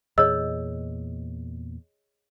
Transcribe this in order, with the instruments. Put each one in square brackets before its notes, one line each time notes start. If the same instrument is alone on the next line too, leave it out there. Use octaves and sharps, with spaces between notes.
[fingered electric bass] E2 A#2 [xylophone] G#4 E6 [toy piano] C#5 D#5